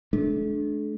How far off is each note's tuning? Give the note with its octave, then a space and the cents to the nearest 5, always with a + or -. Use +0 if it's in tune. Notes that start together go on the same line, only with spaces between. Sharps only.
A3 -40 D4 +0